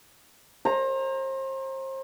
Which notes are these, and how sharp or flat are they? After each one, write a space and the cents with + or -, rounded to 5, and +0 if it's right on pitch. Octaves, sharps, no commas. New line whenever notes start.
C5 +35 A#5 +0